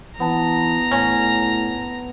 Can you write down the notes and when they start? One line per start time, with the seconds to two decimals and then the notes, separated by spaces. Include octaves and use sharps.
0.20 E3 B3 A5 A#5
0.91 A2 C#4